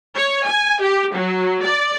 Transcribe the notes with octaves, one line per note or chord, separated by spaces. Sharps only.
C#5
G#5
G4
F#3
D5